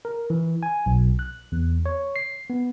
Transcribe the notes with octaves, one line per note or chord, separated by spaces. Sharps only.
A#4
E3
G#5
B1
F#6
E2
C#5
C7
B3